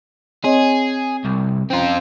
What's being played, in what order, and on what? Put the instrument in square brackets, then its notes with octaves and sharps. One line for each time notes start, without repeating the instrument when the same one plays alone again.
[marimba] C4 C#5 D#5 [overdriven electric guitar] G#4
[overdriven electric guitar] C2
[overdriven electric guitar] C4 F4 [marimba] C#4 A#5